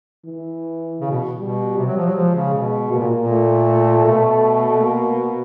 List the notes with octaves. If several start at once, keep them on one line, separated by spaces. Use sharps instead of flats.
E3
C#3
B2
B2 G3
C3 G3
F#3
F3
F#3
F3 G#3
C#3
B2
B2 A#3
A#2
A#2
A3
B2 A3
A#3